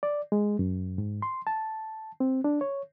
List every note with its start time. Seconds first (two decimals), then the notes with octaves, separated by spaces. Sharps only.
0.03 D5
0.32 G#3
0.59 F#2
0.98 G#2
1.22 C6
1.47 A5
2.20 C4
2.44 D4
2.61 C#5